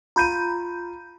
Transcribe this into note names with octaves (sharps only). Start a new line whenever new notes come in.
F4 A#5 B5 G6 D#7